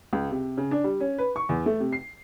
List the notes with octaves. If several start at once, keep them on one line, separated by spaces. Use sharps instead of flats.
C#2
C3
C#3
D4
G3
C#4
B4
C#6
E2
A3
C3
C7